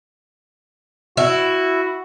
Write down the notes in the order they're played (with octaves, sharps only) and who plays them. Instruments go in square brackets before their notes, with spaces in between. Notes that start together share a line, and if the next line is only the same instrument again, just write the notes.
[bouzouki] E4 [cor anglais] F#4